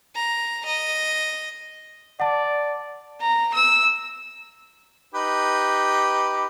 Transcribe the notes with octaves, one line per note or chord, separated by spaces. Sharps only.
A#5
D#5
D5 F#5 A5
A#5
E6
D#4 G4 B4